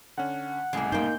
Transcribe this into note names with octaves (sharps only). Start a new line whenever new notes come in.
D3 C#4 F#5
C2 A2 C#3 G#3 A#3
A#3 D#4 C5 G5 G6